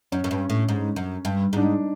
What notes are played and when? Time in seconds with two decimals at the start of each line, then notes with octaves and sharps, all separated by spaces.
0.12 F#2 C#4
0.24 F#2
0.31 G2
0.50 A2
0.69 G#2
0.96 F#2
1.25 G2
1.53 G#2 D4
1.63 D#4